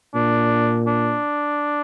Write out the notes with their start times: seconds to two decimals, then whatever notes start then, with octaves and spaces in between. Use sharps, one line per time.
0.14 A#2 D4
0.87 D4